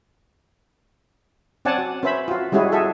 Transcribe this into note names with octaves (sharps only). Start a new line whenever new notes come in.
C4 C#4 D5 F#5 G#5 A5
F#4
C#4 B4 C5 E5 B5
F4 F#4
G3 G#3 C#4 E4 F#4 G#4
F#4 G#4 A4 E5